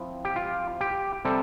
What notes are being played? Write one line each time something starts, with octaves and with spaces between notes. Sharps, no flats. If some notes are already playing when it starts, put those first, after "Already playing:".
Already playing: F3 C4 E4
G4
F4
G4
C3 G3 C4 A4